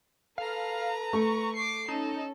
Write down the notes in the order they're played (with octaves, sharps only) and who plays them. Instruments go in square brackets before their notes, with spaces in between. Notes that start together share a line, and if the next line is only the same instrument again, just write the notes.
[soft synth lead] A4 [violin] B4 A#5 [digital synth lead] F5
[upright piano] A3 [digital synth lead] C#6
[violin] D6 C7
[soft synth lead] C#4 [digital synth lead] D#4 [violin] A4